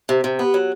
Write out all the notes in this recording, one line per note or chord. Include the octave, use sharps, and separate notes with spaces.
C3
C3
B3
F#3